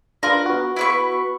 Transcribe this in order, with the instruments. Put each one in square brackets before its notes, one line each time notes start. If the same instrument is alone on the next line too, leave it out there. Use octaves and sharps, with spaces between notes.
[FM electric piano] D4 F4 [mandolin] A#4 B4
[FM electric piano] B3 F#4
[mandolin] E4 B4 C#6